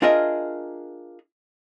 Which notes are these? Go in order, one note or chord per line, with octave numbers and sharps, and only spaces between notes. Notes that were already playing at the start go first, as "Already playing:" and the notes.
D4 F4 G#4 A#4 D#5 E5